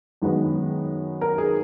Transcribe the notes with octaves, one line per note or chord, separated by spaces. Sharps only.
F#2 D#3 G#3 B3
A#4
G#4